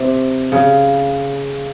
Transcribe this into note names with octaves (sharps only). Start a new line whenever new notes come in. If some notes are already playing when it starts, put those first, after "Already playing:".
Already playing: C3
C#3